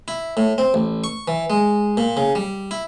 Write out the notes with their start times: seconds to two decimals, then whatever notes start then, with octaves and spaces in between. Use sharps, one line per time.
0.08 E4
0.37 A2
0.58 C4
0.74 A1
1.04 C#6
1.28 E3
1.50 G#3
1.97 A#2
2.17 C#3
2.35 G3
2.71 E4